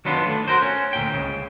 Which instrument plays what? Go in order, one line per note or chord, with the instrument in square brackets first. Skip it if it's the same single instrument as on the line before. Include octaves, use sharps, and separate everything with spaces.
[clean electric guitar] D#3 F#3 B3 D4 F4
A3 D4
F#4 A#4 C5
C#4
D2 A#2 G5
C#2 C#3